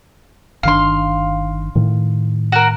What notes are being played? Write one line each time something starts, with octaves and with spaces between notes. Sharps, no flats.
G1 D#3 D4 F5 C6
A2 D#3
F#4 A#4